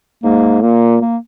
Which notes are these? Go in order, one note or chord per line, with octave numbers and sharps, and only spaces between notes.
G#2 A#3
A#2 A#3
A#3